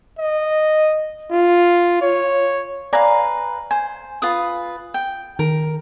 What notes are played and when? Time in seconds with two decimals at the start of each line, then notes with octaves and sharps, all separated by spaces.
0.19 D#5
1.32 F4
2.02 C#5
2.93 B4 D5 F5 G#5 A#5
3.71 C5 G#5
4.22 F4 B4 D#6
4.94 G5
5.39 D#3 A#4